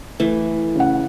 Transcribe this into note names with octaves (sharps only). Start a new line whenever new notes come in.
E3 A3
C#3 F#5